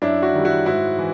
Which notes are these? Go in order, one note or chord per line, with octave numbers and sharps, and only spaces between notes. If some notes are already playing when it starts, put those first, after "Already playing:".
F#2 D4 E4
E4 F#4
D#3 G3
E4 F#4
G#2 E4 F#4
E3